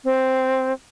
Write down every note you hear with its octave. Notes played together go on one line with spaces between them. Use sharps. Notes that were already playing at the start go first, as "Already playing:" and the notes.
C4